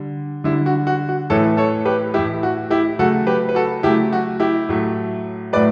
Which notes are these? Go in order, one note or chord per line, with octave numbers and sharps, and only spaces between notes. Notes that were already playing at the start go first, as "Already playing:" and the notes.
Already playing: D3 G3
D3 G3 E4
F#4
F#4
F#4
A2 E3 A3 A4 C#5
A4 C#5
G4 B4
A2 E3 A3 E4 G4
F#4
E4 G4
C#3 F#3 A3 F#4 A4
G4 B4
B4
F#4 A4
C#3 F#3 A3 E4 G4
F#4
E4 G4
A2 F#3 A3
A2 F#3 A3 B4 D5